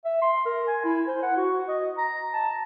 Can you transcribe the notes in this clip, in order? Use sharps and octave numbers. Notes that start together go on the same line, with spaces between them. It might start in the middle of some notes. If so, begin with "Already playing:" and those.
E5
C6
A#4
G#5
E4
C5
F#5
F#4
D#5
A#5
A5